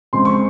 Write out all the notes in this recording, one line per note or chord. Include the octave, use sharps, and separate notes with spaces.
C#3 G#3 C4 C6
C#6